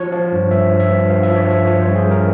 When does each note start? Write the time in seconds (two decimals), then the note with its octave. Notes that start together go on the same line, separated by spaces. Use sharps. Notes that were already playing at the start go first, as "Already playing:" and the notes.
Already playing: F3 C#5
0.12 F3
0.32 G2
0.51 G2 E5
0.70 F3
0.80 E5
0.89 G2
1.09 G2 F5
1.23 E5
1.29 F3
1.36 C#5
1.48 F3 E5
1.66 F3 C#5
1.82 G2 C5
1.95 G#4
2.06 G2 A#4